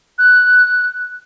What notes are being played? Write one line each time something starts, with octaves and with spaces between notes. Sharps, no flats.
F#6